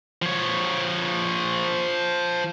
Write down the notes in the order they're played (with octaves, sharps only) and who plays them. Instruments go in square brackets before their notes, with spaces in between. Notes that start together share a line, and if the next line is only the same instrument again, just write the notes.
[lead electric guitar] F3 C#5